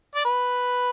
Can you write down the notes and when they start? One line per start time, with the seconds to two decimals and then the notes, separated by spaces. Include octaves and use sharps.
0.15 D5
0.25 B4